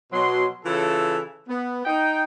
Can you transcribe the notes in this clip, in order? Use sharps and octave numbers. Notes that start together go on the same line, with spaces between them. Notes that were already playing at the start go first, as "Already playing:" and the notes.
B2 F#3 C6
C#3 E3 E4 F4 A4
B3
D#4 G5